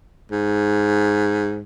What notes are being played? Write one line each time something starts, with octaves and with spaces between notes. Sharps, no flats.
G#2